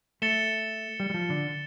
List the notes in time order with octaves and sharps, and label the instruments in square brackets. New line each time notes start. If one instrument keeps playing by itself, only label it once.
[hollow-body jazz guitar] A3 [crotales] A6 C#7 E7 G7
[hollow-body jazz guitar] G3
G3
F3
D3